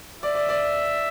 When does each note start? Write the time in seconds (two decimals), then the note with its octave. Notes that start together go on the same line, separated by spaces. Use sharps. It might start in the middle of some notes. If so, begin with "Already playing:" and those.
0.22 D5 E5
0.35 D5
0.49 D5